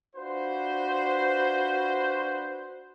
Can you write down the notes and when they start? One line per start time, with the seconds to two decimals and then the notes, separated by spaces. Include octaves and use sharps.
0.16 D4 F4 F#4 B4 C5